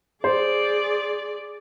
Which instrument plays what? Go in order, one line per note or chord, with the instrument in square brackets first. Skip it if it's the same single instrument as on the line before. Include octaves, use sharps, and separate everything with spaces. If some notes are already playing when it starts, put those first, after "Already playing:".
[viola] G#4 D5 [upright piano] C5